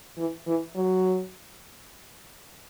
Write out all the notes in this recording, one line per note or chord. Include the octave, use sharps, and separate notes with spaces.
E3
E3
F#3